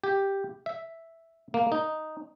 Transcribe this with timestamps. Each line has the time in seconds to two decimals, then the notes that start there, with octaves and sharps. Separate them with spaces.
0.04 G4
0.66 E5
1.54 A#3
1.72 D#4